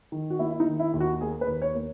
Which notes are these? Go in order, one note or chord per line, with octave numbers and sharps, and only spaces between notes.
D#3
F#4
A#3 E4
E4
D#4
D#3
E4
D#2
F#4
A#3 G#4
B4
D#2
C#5
A#3